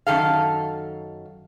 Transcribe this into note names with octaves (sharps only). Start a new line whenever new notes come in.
F#2 D#3 A4 F5